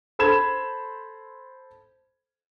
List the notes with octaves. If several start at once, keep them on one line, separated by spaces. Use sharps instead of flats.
A4 C5 B5 G#6 E7